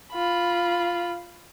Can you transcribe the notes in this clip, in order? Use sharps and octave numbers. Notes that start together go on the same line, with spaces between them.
F4 B5